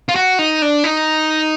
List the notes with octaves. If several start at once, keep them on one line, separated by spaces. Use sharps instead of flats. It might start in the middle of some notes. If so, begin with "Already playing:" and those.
F4
F#4
D#4
D4
D#4